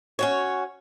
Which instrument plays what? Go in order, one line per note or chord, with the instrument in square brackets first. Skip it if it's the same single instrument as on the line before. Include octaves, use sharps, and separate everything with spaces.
[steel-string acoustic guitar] C#4 F#4 C#5